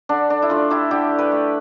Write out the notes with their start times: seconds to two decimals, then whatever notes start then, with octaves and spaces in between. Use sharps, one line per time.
0.09 D3 D4
0.30 D4
0.42 E4
0.50 A3 D4 F4
0.70 E4 G4
0.91 D3 E4 G4
1.18 G4 B4
1.32 A3